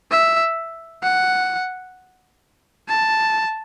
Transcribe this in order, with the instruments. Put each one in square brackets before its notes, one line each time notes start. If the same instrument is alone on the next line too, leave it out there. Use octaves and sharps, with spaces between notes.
[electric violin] E5
F#5
A5